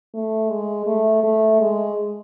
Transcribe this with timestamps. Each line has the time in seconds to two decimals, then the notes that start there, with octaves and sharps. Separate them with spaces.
0.14 A3
0.50 G#3
0.86 A3
1.24 A3
1.61 G#3